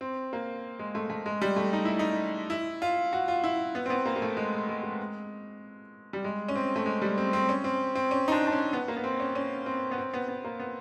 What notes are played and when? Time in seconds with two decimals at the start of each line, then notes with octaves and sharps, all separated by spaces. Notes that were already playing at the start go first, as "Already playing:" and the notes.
0.01 C4
0.33 A#3
0.79 G#3
0.95 A3
1.10 A3
1.26 G#3
1.42 G3
1.56 A3
1.73 D#4
1.85 E4
1.99 D#4
2.50 E4
2.82 F4
3.13 F#4
3.28 F4
3.44 E4
3.75 B3
3.86 C4
3.90 B3
4.06 A#3
4.16 A#3
4.22 A3
4.37 G#3
4.69 G#3
4.83 G#3
6.13 G3
6.24 G#3
6.48 C#4
6.55 C4
6.76 A3
6.86 G#3
7.02 G3
7.18 C4
7.33 C4
7.49 C#4
7.64 C4
7.95 C4
8.11 C#4
8.28 D#4
8.32 D4
8.47 D4
8.52 C#4
8.73 B3
8.88 A#3
8.97 B3
9.04 C4
9.20 C#4
9.35 C#4
9.66 C4
9.91 B3
9.98 C4
10.14 B3
10.28 B3
10.44 A#3
10.60 B3